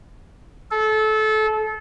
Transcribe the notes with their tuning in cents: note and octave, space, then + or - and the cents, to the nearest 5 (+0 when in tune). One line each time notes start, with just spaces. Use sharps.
A4 -25